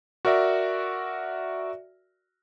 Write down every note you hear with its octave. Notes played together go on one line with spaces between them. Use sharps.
F#4 A#4 D5 E5